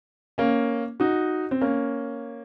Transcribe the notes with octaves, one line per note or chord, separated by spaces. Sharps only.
A#3 C#4
D#4 F#4
C4
A#3 C#4